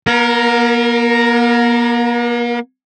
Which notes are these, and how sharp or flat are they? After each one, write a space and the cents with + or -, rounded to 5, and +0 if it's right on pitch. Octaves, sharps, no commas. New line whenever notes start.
A#3 +45 A#4 +0